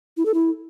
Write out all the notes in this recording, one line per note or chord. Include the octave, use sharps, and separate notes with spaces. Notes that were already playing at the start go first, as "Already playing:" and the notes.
E4
A4
E4